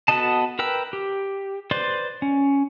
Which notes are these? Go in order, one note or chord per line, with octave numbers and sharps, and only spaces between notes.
B3 F#4 A4 D#5 A5
A#4 B4 G5 E6
G4
B4 C5 D5 C6
C#4